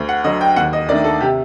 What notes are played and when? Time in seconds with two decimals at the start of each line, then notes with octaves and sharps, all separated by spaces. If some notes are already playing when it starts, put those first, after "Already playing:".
Already playing: D2
0.09 F#5
0.24 D3 F#3 D#5
0.41 G5
0.56 D#2 F#5
0.73 D#5
0.88 D#3 A3 D4 D5
1.04 A4
1.21 C3 G4